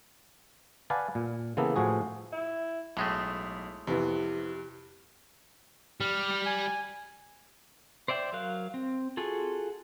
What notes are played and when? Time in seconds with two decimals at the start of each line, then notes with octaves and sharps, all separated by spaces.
0.90 B4 D5 F5 F#5 G#5 A5
1.15 A#2
1.57 C#3 E3 A#3 B3 A4
1.76 A2 F3 F#4 G#4
2.32 E4
2.97 B1 A2 G#3 A3
3.87 F2 C3 E3 B3 G4
6.01 G3 F6
6.46 G#5
8.08 C5 D5 E5 G5
8.33 F#3 A#4 F5 F#6
8.74 C4
9.17 F4 F#4 G#4 A4